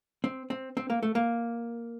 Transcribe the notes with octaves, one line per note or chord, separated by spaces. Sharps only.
C4
C4
C4
A#3
A3
A#3